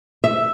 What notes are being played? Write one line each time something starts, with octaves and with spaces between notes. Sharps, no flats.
E5